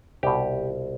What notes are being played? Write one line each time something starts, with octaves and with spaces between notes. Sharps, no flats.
C2 B2 G4